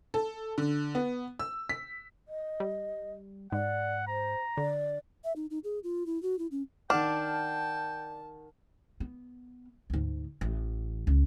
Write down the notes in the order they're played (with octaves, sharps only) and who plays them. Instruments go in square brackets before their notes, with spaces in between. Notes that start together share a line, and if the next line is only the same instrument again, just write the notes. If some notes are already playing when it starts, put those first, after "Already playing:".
[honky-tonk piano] A4
D3
B3
E6
B6
[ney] D#5
[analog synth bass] G3
[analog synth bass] G#2 [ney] D5 [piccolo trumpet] F#5
[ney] C5 [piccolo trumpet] A#5
[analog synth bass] D3 [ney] D5
[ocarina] E5
D#4
D#4
G#4
F4
E4
F#4
E4
C#4
[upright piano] D#3 F#5 F6 [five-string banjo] D4 [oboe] G5 [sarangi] A5
[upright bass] B3
D2 G#2
A1
C#2